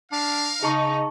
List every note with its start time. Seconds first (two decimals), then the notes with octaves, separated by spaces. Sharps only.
0.12 D4 A#4 F5
0.63 C#3 D#4 G#4 A5 C#6